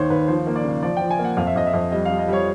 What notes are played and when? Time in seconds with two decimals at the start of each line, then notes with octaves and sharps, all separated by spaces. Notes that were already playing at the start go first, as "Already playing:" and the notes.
Already playing: D#2 D#3 C5 C#5
0.10 D#2 B4
0.28 F3 C5
0.47 A#3
0.56 D5
0.64 C#3
0.83 F3 D5
0.97 F3 G5
1.11 G#5
1.19 A#3
1.24 F#5
1.37 F2 F5
1.47 E5
1.56 F2 D#5
1.67 E5
1.74 F2
1.92 G3 D#5
2.05 G3 F5
2.19 D#5
2.28 G3 C#5